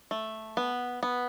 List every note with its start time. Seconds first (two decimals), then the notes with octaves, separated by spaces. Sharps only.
0.11 A3
0.57 B3
1.03 B3